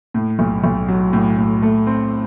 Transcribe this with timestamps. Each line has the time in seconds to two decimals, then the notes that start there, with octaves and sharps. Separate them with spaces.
0.14 A2
0.39 B1
0.64 B1
0.88 F#3
1.13 A2
1.38 A2
1.62 A3
1.87 C4